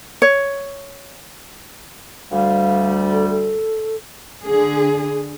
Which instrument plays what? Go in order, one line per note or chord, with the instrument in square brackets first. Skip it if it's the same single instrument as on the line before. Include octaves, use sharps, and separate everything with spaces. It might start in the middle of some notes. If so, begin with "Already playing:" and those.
[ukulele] C#5
[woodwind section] D2 G3 [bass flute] F5
[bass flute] A4
A4
[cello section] D3 G#4